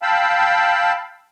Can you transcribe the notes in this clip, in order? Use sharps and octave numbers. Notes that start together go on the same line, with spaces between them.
F5 G5 A5 B5 E6